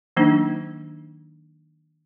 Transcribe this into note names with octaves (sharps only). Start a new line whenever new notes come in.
D#3 F#3 A#3 D4 D#4